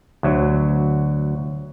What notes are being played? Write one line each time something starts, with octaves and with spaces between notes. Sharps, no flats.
D2 F#3